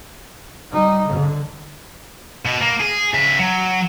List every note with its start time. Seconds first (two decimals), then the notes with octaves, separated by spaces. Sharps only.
0.71 G3 D#4
1.04 D3
2.46 B2
2.62 A#3
2.81 G#4
3.14 C#3 E5
3.39 F#3